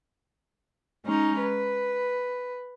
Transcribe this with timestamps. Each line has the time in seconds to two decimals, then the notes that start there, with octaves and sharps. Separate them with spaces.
1.04 G#3 C#4 D#4 A#5
1.40 B4